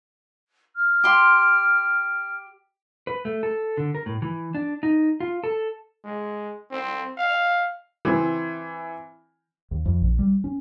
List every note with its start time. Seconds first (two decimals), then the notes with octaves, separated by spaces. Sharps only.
0.75 F6
1.04 G4 C6
3.07 B4
3.25 A3
3.43 A4
3.77 D3
3.95 A#4
4.06 A2
4.22 E3
4.55 D4
4.83 D#4
5.20 F4
5.44 A4
6.05 G#3
6.71 C4
7.18 F5
8.05 E3 C4
9.71 D#2
9.86 F2
10.01 A#1
10.19 G3
10.44 C#4